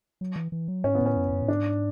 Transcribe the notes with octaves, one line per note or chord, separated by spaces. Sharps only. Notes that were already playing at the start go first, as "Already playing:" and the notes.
F#3
E3
E3
F#3
G#2 C#4
B3
A2 C#4
F#2
E2
F#2
A2
G#2 D4